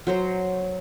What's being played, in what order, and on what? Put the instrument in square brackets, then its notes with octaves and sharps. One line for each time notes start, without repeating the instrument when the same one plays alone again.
[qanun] F#3 C5 A#5